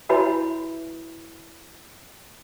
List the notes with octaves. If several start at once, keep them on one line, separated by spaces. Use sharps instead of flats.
E4 F#4 B4 C#5 E5 B5